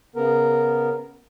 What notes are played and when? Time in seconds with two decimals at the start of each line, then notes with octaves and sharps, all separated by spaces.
0.16 C#3 B3 A#4